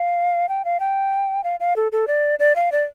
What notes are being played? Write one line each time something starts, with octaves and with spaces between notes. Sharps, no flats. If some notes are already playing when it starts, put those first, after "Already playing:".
Already playing: F5
G5
F5
G5
F5
F5
A4
A4
D5
D5
F5
D5